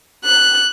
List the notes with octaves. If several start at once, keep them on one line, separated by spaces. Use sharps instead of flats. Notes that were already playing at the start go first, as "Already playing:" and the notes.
F#6